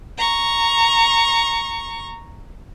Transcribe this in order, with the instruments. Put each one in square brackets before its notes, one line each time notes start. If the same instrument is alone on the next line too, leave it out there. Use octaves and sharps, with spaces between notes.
[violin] A#5 C#6